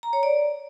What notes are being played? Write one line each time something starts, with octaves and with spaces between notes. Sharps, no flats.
A#5
C#5
D5